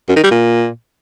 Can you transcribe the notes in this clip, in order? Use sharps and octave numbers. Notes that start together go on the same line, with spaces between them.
F#2
D#3
G3
A#2